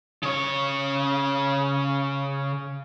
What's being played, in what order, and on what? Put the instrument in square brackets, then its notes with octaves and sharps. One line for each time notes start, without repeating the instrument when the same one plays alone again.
[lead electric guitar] C#3 C#5